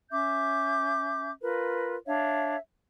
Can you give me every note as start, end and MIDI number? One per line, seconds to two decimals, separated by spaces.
0.11 1.30 61
0.11 1.30 76
0.11 1.30 86
0.11 1.30 91
1.41 1.96 65
1.41 1.96 70
1.41 1.96 71
2.06 2.57 62
2.06 2.57 73
2.06 2.57 76
2.06 2.57 77